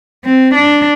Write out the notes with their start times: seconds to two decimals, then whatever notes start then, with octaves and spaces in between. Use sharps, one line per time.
0.25 C4
0.55 D4